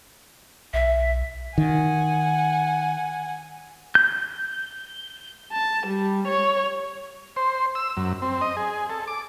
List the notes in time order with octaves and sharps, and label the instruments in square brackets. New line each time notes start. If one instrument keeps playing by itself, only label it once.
[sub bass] B1 [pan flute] E5
[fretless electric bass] D#3 [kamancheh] F#5 G#5
[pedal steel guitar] G6
[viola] A5
G3
C#5
[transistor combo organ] C5
E6
F#2
C4
D#5
G#4
A4
D6